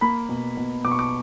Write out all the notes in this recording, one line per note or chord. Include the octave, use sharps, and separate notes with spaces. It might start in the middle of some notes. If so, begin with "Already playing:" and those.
A#3 B5
B2
B2
B2 D6
C#6
D6